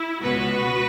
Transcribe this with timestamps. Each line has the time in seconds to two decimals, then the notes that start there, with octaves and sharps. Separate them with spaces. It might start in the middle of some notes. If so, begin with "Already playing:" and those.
Already playing: E4
0.22 C#2 B2 B3 F#4 B4